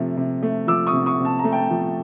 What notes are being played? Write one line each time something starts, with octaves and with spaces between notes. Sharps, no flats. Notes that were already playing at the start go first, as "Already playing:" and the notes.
Already playing: C3 F3 A3
C3
A3
F3 D6 E6
C#6 D#6
C3
C#6 D#6
C3
A5
A#5
A3
G5 A5
F3